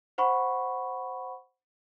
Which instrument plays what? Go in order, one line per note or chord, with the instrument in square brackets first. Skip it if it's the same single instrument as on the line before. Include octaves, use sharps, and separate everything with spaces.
[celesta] C5 F#5 B5 C#6